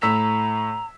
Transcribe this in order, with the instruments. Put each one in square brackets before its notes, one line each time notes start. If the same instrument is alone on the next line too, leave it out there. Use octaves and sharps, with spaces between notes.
[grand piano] A2 E6 B6 [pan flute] A#5